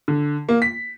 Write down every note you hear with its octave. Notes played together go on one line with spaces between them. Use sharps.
D3
A#3
B6